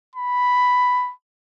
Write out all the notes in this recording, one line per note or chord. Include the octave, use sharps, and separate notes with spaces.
B5